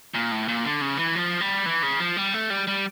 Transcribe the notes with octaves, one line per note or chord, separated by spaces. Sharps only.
A#2
A2
A#2
D3
C#3
E3
F3
G3
E3
C#3
F3
G3
A3
G3
G3